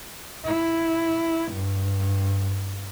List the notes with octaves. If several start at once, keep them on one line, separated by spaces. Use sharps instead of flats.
E4
G2